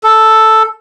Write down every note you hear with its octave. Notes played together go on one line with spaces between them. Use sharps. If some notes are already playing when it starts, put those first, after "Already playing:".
A4